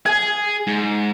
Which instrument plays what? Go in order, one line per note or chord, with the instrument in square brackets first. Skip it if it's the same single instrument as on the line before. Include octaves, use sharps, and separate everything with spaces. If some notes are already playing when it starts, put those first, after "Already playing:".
[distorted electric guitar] G#4 [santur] G#5
[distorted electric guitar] G#2